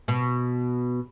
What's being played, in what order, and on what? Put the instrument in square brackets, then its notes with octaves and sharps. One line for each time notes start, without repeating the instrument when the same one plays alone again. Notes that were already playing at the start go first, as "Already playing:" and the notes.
[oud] B2